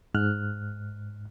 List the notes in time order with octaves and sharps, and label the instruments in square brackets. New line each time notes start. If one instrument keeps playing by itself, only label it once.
[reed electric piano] G#2 F6 F#6